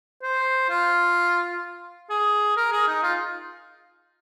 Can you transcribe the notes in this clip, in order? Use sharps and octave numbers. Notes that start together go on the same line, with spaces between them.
C5
F4
G#4
A#4
G#4
D#4
F4